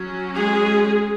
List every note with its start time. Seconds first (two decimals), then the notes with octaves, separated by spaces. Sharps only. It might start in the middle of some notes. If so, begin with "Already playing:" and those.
Already playing: F#3 C#4
0.35 G#3 G#4